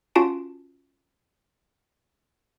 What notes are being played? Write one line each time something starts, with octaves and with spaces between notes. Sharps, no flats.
C#4 F4 F#4 A5 D7